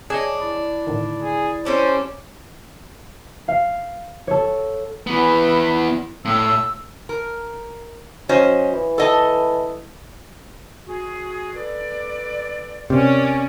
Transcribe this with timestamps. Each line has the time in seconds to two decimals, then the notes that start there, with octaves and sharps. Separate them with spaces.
0.10 D4 G#4 C#5 D#5
0.41 E4 D5
0.87 A2 D3 D#3
1.22 G#4
1.65 G3 C#4 D4 C5
3.48 F5
4.27 A4 C#5
5.07 E3 B3 B4
6.25 A2 E6
7.09 A#4
8.29 F#3 C#4 C5 D#5
8.73 E3
8.98 A4 D#5 A5
10.87 F#4 G#4
11.55 A4 B4 D5
12.90 C3 C#4 G4 A#4 D5